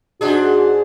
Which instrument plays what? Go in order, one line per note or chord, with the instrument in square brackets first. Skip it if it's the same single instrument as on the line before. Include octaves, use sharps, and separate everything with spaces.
[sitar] G#2 D4 G#4 [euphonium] F#4